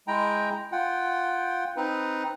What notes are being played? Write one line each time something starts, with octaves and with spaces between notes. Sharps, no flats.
G#3 E4 G5 A#5
F4 F#5 G5
C4 D#4 B4